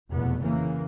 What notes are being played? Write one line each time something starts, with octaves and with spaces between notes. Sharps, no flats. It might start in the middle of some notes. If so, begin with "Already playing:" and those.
F1 E2 B2 B3
C#3 E3 A#3